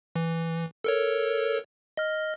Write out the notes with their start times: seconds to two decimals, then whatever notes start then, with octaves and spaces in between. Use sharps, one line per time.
0.16 E3
0.84 A4 A#4 C#5
1.97 D#5 F6